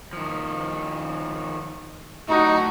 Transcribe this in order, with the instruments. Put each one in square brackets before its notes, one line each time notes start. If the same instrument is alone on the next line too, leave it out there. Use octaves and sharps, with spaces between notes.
[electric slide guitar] D#3 F3
[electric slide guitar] A2 D4 [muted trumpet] D#4 [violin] F#4